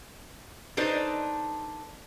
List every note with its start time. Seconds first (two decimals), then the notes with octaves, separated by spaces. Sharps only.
0.77 D4 D#4 A4 B4 C5